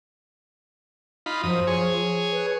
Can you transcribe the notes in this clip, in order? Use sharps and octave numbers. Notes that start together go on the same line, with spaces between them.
D#4 F4 B5
F#2 F3 D#6
G#4 C#5
B4